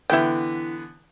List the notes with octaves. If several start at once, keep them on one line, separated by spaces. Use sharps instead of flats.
D3 E3 B3 E4 G5